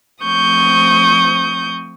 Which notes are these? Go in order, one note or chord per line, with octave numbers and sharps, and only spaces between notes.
F3 A3 C4 C#6 D#6 G6